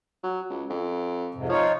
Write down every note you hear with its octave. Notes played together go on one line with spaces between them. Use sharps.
F#3
C#2
F2
F2 G#2 C3
F3 D#4 F4 C#5